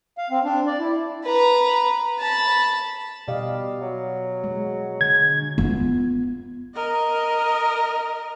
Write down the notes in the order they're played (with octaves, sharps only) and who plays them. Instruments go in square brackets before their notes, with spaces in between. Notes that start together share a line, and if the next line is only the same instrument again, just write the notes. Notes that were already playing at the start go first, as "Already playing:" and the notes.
[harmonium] F5
C4
D4
D5
E4
[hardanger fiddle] B4 A#5
A5 B5
[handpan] B2 D#5 F5 [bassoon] G3
[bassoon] F#3
[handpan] G#3
[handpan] D3 [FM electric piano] G#6
[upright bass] B3 F4
[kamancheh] A#4 D#5